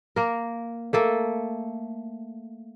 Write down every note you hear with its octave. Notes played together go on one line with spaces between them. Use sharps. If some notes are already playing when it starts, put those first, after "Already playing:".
A#3 A#4
A3 A#3 A4